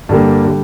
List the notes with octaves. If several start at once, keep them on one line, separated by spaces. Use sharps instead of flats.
G2 D3 G3 A#3
D3 G3